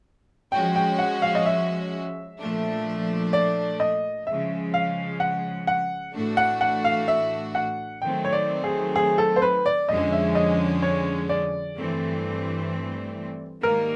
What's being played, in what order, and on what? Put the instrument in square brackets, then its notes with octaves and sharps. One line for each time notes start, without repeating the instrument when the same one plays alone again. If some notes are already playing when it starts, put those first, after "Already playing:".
[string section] F3 G#3 C#4 F#4 [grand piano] G5
[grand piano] G5
F#5
F5
D#5
E5
[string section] A#2 F3 A3 D4
[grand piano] D5
D#5
[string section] C#3 F3 G#3 [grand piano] E5
[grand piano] F5
F#5
F#5
[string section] A2 E3 A3 D4 F#4
[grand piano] F#5
F#5
F5
E5
F#5
[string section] D#3 F#3 A3 C4 [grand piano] G5
[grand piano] C#5
D5
G#4
G#4
A4
C5
B4
D5
[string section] F2 D3 F3 G#3 C#4 [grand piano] D#5
[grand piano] E5
D#5
C#5
D5
[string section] G2 E3 A3 C4
[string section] G#2 D#3 G3 A#3 [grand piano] A#4